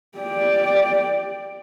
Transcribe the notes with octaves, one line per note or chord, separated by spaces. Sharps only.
G4 D5